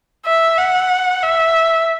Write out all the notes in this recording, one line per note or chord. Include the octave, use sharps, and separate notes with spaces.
E5
F#5
E5